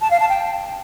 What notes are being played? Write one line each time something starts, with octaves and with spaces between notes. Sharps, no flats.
A5
F5
A5
G5